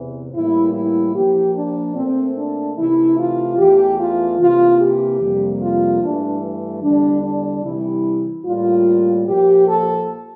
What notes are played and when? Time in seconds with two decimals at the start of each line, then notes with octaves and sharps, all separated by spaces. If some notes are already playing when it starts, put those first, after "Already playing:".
Already playing: E2 C3 E3
0.33 A2 E3 G3 A#3 E4
0.73 E4
1.14 A#2 F3 A#3 G4
1.54 D4
1.95 A#2 A3 C4
2.36 D4
2.76 C3 E3 A3 E4
3.17 F4
3.57 E2 E3 A3 G4
3.98 F4
4.39 C3 E3 A#3 F4
4.80 G4
5.20 F2 C3 G3 A#3
5.60 F4
6.01 G2 E3 A3 D4
6.82 E2 D3 G3 D4
7.23 D4
7.63 C3 E3 G3 E4
8.44 A2 G3 A#3 F4
9.26 A#2 F3 A#3 G4
9.67 A4